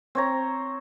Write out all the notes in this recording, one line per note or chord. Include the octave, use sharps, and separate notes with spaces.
C4 C#5 A#5